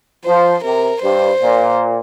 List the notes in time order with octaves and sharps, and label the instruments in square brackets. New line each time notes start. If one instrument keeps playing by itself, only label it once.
[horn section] F3 [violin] C5
[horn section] C3 [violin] A#4
[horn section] G2 [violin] C5
[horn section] A#2